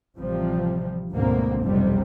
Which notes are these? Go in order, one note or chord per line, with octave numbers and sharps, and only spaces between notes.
A1 C3 F3 G3
D2 G#2 B2 D3 A#3 C4
F1 B1 G2 C3 G3